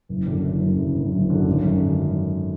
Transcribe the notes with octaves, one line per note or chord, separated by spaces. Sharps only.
F#1
F#2 D3
F#1
F#2 D3
F#1
F#2 D3
F#1
F#2 D3
G#1
F#2 D3